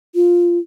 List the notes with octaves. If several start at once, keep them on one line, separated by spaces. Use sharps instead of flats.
F4